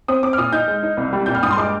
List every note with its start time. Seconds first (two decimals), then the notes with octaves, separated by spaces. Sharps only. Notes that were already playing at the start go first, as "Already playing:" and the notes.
0.08 C4 D#6
0.23 C4 D6
0.33 F6
0.38 A#2 D#6
0.53 D#4 G6
0.68 G#3
0.83 D#4
0.97 C2
1.13 G3
1.26 A#2 G6
1.35 F6
1.43 G2 D#6
1.51 C6
1.57 G#3 D6